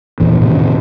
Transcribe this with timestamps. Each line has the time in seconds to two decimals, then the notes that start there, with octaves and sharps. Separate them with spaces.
0.20 E2 A#2 E3
0.41 A2 C3 D#3